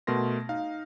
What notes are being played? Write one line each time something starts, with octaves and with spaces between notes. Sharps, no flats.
B2 A3 A#4 C6 A#6
D#4 F5